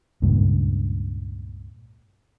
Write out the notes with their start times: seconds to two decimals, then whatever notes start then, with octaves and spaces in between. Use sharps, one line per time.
0.22 C#2 G2 A#2